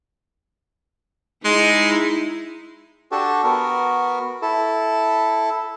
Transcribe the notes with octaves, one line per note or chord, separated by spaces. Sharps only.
G#3 D#4 E4
D4 F#4 G4 A4
B3 F#4 A#4
E4 A4